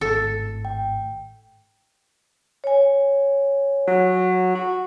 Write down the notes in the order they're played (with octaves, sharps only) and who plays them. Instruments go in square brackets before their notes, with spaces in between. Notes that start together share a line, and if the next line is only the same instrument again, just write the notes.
[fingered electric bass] G#1 A2 [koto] A4
[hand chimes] G5
[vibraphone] C#5 G#5
[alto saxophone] F#3
F#4